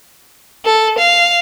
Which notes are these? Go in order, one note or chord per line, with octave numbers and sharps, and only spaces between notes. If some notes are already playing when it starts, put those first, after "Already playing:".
A4
F5